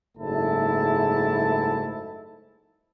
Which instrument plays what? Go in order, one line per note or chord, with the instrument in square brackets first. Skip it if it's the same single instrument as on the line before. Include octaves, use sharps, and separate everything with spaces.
[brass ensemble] F#1 G#2 A3 E4 A5